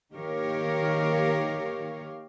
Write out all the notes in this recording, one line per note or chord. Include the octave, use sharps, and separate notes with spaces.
D#3 A#3 G4 A#4 C#5 F5